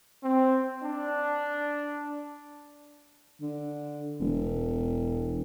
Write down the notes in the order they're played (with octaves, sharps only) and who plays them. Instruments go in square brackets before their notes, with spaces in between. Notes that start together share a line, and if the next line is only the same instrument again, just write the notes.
[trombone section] C4
D4
[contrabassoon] D3
E1